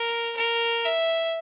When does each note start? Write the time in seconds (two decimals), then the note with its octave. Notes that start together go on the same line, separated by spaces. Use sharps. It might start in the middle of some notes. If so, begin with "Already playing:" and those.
Already playing: A#4
0.37 A#4
0.85 E5